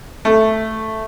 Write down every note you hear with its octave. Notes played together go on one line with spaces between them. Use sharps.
A3